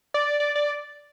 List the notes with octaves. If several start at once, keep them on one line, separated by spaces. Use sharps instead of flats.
D5
D5
D5